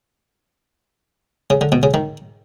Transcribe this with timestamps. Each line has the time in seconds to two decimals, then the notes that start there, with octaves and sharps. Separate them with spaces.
1.50 C#3
1.61 D3
1.72 B2
1.83 C#3
1.94 D#3